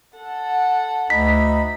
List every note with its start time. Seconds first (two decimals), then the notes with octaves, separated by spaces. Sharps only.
0.17 A4 F#5
1.10 D2 D#4 B5 B6